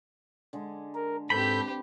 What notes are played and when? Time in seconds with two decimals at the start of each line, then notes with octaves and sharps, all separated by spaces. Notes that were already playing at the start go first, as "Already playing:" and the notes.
0.53 D3 G#3
0.95 A#4
1.30 G#2 C4 D4 G4 A4 B4 B5 G6